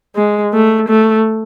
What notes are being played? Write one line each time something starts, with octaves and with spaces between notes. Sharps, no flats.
G#3
A3
A3